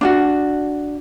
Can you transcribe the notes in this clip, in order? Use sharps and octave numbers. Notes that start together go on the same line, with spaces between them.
D4 F4 F#4